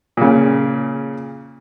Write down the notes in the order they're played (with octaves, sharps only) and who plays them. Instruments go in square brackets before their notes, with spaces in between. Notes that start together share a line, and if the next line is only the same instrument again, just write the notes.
[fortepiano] A#2 C#3